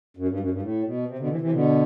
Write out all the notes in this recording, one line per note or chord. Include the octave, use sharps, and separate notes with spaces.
F#2
G2
F#2
G2
A2
B2
C3
B2 D3
C3 E3
C3 E3
B2 D3